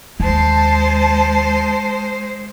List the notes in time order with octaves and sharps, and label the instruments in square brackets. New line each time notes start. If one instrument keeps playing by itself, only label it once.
[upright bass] D#2 [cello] G#3 C5 [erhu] A5